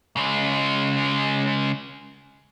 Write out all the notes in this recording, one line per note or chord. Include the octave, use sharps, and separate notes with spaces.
C#3 G#3